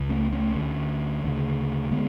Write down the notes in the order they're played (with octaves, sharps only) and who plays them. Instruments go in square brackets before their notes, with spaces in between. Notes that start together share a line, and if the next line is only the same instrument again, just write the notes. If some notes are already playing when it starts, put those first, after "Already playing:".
Already playing: [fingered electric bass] C#2 C#3
A3 C#4
A3 C#4
D2 D3
D2 C#3
D3 G#3 B3